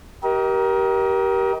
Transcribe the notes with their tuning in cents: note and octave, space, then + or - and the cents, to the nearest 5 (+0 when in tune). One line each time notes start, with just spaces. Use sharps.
G4 -20 A#4 +25 D#5 +35